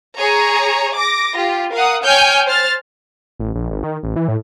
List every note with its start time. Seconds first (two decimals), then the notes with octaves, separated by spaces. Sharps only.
0.18 G#4 C#5 A#5
0.96 D6 A#6
1.37 F4 G4
1.73 A#4 F5 F#5 D#6
2.05 C#5 G5 G#5 F6 G6
2.46 C5 F6 A6
3.39 A1
3.55 A#1
3.71 G#1
3.83 D#3
4.03 A1
4.16 E3
4.28 A2